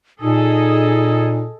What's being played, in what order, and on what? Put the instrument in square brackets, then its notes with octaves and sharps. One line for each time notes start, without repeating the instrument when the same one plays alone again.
[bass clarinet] A#2 [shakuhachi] D#4 [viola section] G#4 A4 D#5